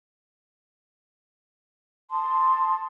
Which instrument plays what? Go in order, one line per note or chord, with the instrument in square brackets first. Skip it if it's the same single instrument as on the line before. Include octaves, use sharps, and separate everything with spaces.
[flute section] A5 C6 D#6